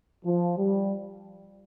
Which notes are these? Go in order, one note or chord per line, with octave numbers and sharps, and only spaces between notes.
F3
G3